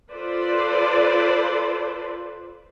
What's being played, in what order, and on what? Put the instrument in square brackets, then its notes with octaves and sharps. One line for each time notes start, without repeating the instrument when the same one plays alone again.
[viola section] F4 A4 B4 C5 D5